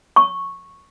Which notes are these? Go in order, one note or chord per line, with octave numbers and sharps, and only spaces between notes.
C#6